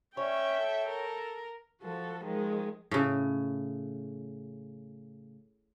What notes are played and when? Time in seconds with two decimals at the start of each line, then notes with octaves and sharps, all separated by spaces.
0.17 C#4 C#5 E5 G5
0.59 A4
0.89 A#4
1.82 F3 F#4 A4
2.24 D#3 F3 G#3
2.91 A2 C#3